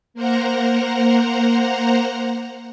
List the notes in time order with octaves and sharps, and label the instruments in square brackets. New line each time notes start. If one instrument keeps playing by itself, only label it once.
[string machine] A#3 A#4 C5 F#5 A#5